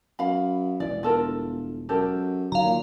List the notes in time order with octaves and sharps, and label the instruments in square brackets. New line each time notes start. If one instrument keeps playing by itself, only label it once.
[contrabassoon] F#2 [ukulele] F5 B5
[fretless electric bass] E1 C#2 E3 [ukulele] D5
[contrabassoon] G1 [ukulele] F4 A4 A#4
[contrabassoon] F#2 [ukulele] G4 A4 A#4
[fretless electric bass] D1 D#3 F#3 [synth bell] F5 A#5
[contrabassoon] A#2